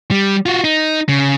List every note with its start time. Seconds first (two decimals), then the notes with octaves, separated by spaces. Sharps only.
0.11 G3
0.46 F4 F#4
0.64 D#4
1.09 C#3